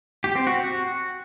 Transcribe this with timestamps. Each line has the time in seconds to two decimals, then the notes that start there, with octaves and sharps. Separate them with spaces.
0.24 G4
0.35 C4
0.47 F#4